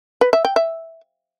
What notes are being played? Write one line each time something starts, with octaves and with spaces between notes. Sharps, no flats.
B4
E5
G5
E5